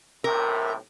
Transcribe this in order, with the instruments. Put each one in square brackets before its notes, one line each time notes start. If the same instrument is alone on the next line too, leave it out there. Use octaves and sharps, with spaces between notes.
[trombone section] B1 A2 C3 [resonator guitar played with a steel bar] A#4